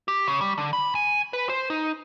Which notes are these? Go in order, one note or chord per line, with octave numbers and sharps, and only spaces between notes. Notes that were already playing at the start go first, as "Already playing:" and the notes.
G4
C#3
G3
D3
B5
G#5
B4
C5
D#4